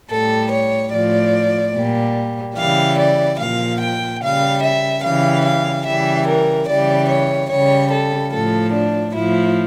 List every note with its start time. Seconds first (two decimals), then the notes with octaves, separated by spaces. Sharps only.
0.10 A2 G3 A4
0.51 C#5
0.92 A2 F3 D5
1.74 A#2 G3
2.57 C#3 E3 G3 F5
2.98 D5
3.39 A#2 F3 F5
3.80 G5
4.21 C#3 G3 F5
4.62 E5
5.03 C#3 E3 G3 F5
5.45 F5
5.85 C#3 E3 G3 E5
6.27 A#4
6.68 C#3 E3 G3 D5
7.09 C#5
7.50 C#3 G3 C#5
7.92 A4
8.32 A2 F3 A4
8.73 D4
9.14 A2 F3 E4